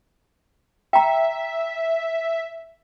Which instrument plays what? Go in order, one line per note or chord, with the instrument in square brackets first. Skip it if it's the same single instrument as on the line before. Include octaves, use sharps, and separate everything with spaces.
[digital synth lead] E5 [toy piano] G5 A#5